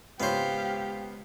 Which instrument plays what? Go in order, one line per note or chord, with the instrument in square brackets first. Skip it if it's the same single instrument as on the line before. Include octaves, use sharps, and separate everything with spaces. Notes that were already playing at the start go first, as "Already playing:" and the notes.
[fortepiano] C#2 G#2 C#5 [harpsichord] B3 C5 [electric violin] G4 [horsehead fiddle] F5